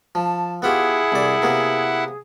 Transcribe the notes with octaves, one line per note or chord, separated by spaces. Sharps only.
F3 A5
B3 E4 F4 G4 G#4 F#5
C2 D5
C3 A#3 B3